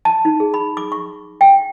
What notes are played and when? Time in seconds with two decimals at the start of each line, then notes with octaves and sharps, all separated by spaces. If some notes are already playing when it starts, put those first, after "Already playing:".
0.05 A5
0.25 D#4
0.40 G#4
0.54 B5
0.77 D6
0.92 C#6
1.41 G5